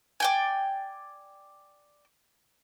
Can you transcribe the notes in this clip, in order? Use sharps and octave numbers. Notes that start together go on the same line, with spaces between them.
D5 G5 G#5